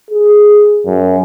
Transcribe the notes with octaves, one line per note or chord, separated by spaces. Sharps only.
G#4
F#2